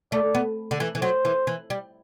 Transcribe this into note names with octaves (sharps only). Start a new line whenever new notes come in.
A3 D5
B3
D3
E3
E3
F#3 C5
E3
E3
G3